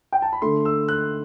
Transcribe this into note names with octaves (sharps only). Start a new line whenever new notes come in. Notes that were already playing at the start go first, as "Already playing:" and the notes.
G5
A5
B5
D3 A3 C6
E6
F#6